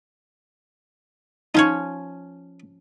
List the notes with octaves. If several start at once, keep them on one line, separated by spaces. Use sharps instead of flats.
F3 C#4 D#4 C#5